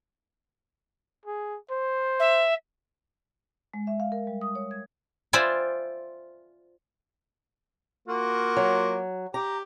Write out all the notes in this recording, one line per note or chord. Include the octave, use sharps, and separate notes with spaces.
G#4
C5
E5
G#3
E5
F5
A#4
G3
D#6
C#5
G#6
F4 C5 D5 E5 G5 G#5
A#3 F4 F#4
F#3
G4 A#5